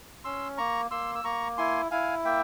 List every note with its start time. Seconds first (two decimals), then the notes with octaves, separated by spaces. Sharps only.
0.24 C#4 C6 E6
0.58 A#3 A#5 C#6
0.91 A#3 C6 E6
1.15 E6
1.24 A#3 A#5 C#6
1.58 E4 G#5 C6
1.91 E4 F5 G#5
2.25 A#3 E5 G5